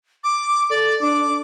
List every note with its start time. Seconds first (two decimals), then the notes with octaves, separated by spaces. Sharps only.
0.24 D6
0.70 A4 D5
1.01 D4 D6